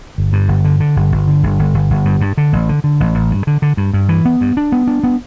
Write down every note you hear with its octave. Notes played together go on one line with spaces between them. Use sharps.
G1
G2
G1
D3
D3
G1
G1
D3
G1
G1
G1
G1
G2
G2
D3
A1
D3
D3
A1
A1
G2
D3
D3
G2
G2
E3
B3
G2
D4
B3
D4
B3